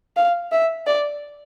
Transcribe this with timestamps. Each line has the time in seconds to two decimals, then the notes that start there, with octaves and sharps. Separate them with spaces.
0.17 F5
0.52 E5
0.86 D5